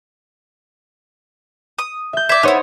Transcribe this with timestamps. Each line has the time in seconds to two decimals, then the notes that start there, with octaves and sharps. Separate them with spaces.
1.79 D#6
2.13 E5 G6
2.29 D5 E5 G#6
2.43 B3 D#4 E4 C5 C#5